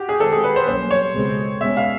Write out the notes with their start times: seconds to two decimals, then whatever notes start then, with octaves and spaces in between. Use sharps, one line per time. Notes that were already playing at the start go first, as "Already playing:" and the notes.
Already playing: F#4 G4
0.09 G#4
0.20 D#3 G#3 C4 A4
0.32 G#4
0.44 B4
0.56 C5
0.67 C2 B2 F#3 A#3 C#4 C5
0.91 C#5
1.14 C#2 B2 G#3 C4
1.61 B2 G#3 C#4 E5
1.77 F5